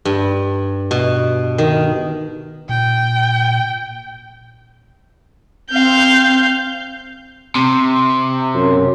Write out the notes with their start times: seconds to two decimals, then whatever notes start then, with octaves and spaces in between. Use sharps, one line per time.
0.05 G2
0.91 B2
1.58 D#3
2.69 A#2 G5
5.71 C4 F5 G6
7.55 C3
8.55 F#2